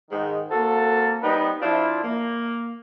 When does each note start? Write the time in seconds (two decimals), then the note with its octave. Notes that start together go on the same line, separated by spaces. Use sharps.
0.11 G#2 D#3
0.52 A#3 C4 F#4 A4
1.23 G3 B3 C4 D#4 B4
1.62 F3 C4 D4 E4 F4
2.04 A#3